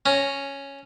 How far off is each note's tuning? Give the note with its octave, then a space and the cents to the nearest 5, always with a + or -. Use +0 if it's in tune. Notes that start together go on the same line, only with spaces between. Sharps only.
C#4 +0 A#5 +0